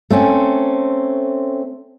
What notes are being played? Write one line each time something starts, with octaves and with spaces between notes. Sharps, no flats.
A3 C4 C#4